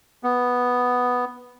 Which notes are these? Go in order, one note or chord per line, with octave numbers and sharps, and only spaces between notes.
B3